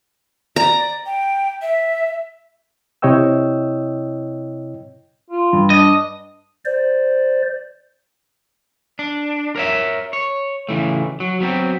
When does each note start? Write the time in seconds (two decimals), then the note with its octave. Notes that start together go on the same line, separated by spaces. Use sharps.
0.56 D5 A#5
1.06 G5
1.62 E5
3.02 C3 E4 C#5 D#5 G5 E6
5.31 F4
5.53 G2
5.70 D4 D#5
6.65 C5 D5
8.99 D4
9.56 A#4 C#5 E5
10.13 C#5
10.69 C#3 E3 A3
11.20 F#3
11.40 F#3 B3 C4